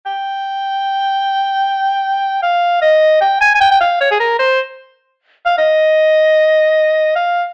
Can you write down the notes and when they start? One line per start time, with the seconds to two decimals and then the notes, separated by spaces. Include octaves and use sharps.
0.06 G5
2.43 F5
2.82 D#5
3.21 G5
3.41 G#5
3.55 G#5
3.60 G5
3.71 G5
3.81 F5
4.00 C#5
4.11 G#4
4.20 A#4
4.39 C5
5.46 F5
5.58 D#5
7.16 F5